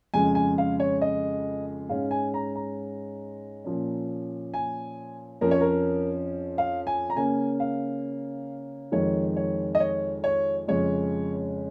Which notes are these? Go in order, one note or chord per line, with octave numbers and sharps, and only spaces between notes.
F2 C#3 G#3 G#5
G#5
F5
C#5
D#5
G#2 G#3 C#4 F5
G#5
A#5
A#5
A#2 F3 C#4
G#5
F2 F3 C#4 A#4
C#5
A#4
F5
G#5
A#5
C#3 A#3 C#4 G#5
F5
F2 D#3 G#3 C#5
C#5
D#5
C#5
C#5
F2 C#3 G#3 C#4 C#5